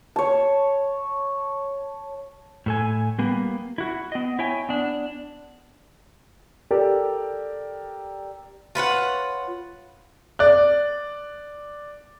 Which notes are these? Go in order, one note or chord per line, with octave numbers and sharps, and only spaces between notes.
C#5 A5
A2 A4 G#5
G3 A#3 B3
E4 F#4
B3 D#5
E4 C#5 G5 G#5
B3 D4
G4 A4 A#4 D5
F4 B4 C#5 F#5
D5 F#6